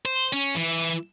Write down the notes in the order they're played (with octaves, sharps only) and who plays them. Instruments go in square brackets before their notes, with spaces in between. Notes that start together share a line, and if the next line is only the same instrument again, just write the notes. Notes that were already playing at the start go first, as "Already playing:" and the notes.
[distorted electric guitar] C5
C#4
E3